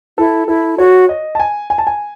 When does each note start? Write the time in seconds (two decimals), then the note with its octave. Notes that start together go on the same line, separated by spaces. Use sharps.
0.18 E4 A4
0.48 E4 A4
0.78 F#4 C#5
1.09 D#5
1.35 A5
1.40 G#5
1.70 G#5
1.78 A5
1.87 G#5